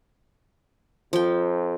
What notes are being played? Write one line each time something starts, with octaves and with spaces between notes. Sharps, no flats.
F2 F3 G5